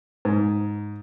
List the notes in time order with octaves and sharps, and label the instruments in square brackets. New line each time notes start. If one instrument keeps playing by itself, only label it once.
[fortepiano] G#2